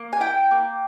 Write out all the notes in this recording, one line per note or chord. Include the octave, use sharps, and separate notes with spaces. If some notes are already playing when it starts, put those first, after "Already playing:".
Already playing: A#3
G#5
E4 G5
A#3